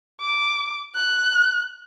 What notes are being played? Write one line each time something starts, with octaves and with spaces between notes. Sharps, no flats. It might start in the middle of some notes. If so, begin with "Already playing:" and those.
D6
F#6